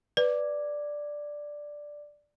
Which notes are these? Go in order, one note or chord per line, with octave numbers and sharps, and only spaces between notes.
B4 D5